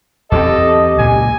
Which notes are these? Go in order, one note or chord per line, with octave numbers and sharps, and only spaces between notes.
E2 C4 G4 A4 D#5
C#2 A#2 G#5